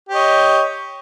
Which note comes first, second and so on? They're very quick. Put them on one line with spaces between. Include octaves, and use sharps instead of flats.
G4 C#5 D#5